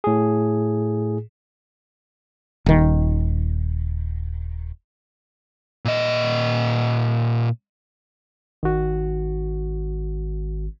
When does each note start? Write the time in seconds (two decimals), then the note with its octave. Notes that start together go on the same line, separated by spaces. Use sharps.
0.04 A2 G#4
2.66 D#1 D#3
5.85 A#2 D#5
8.63 G#1 D#3 F#4